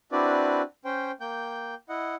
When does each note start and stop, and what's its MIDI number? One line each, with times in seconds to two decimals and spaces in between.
0.12 0.62 60
0.12 0.62 62
0.12 0.62 64
0.12 0.62 66
0.12 0.62 71
0.12 0.62 74
0.85 1.11 61
0.85 1.11 72
0.85 1.11 79
1.21 1.75 58
1.21 1.75 79
1.21 1.75 91
1.89 2.15 64
1.89 2.15 75
1.89 2.15 78